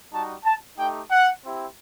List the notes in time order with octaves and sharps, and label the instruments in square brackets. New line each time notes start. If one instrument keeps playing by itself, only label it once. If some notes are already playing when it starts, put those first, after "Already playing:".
[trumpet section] G3 D#4 F#4 A5
A5
A3 D#4 G4 G5
F#5
C4 E4 G4